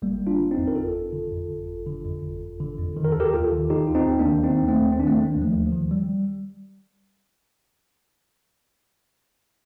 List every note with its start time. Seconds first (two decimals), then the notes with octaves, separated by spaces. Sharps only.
0.02 G1 G3 A#3
0.21 G1
0.27 D4 F4
0.39 D3
0.51 C4 D#4
0.58 F2
0.68 A#4
0.75 G1 F4 A4
0.94 G1
1.12 D3
1.31 F2
1.49 G1
1.68 G1
1.86 D3
2.05 F2
2.23 G1
2.42 G1
2.60 D3
2.79 F2
2.96 D#3
3.05 A#4
3.12 D#2 A4
3.20 G4 A#4
3.33 D#2 F4 A4
3.52 D#3
3.70 D#3 D#4 G4
3.87 D#2 F4
3.95 C4 D#4
4.07 D#2
4.19 A#3 D4
4.25 D#3
4.44 D#3 C4 D#4
4.62 D#2
4.68 A3 C4
4.81 D#2
4.92 C4
4.99 D#3 D4
5.07 A3 C4
5.17 D#3 A#3 D4
5.36 D#2
5.42 F3 A3
5.54 D#2
5.66 F3
5.72 D#3
5.91 G3